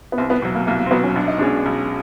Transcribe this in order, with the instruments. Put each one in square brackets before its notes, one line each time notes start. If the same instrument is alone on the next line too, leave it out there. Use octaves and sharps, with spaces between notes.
[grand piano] B3
[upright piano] C2 [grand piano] C4
[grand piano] B3
[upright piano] B2 F#3
[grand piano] A#3
[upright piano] C2 [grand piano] A#3
[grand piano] A#3
C4
[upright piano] B2 F#3 [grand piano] B3
[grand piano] C#4
[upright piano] B1 [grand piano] D4
[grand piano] D#4
[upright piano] B2 G#3 C#4 [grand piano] D4
[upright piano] B1